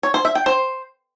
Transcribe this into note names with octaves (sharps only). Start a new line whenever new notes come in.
C#5
C5
E5
G5
C5